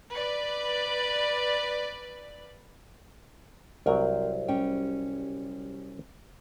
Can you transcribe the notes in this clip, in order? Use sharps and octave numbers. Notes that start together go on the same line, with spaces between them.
B4 D5
C2 F#3 C4 A#4 B4
G3 C#4 G5